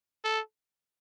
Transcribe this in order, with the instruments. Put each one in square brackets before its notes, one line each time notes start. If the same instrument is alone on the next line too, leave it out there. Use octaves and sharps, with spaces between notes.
[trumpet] A4